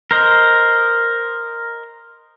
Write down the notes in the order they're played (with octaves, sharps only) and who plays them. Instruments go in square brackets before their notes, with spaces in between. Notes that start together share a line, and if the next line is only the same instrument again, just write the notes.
[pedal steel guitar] A#4 C5 D#5